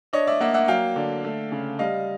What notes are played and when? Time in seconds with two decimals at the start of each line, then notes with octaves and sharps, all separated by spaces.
0.13 D4 C#5 D#5
0.27 D5 E5
0.41 A#3 E5 F#5
0.54 E5 F#5
0.68 F#3 F5 G5
0.96 D3
1.24 A3
1.52 C#3
1.79 G3 D#5 F5